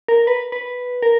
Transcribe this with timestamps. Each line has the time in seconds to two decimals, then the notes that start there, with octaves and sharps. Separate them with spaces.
0.08 A#4
0.27 B4
0.52 B4
1.03 A#4